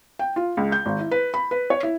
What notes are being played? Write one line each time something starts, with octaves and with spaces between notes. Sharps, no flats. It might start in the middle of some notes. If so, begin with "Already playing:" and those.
G5
F4
C#2
G6
G#1
E4
B4
B5
B4
C#5
E4